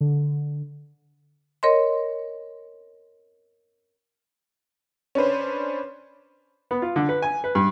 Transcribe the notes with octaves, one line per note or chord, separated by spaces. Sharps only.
D3
A#4 C#5 D#5 C6
C#4 D4 B4 C5
B3
F4
D3
B4
G#5
B4
G2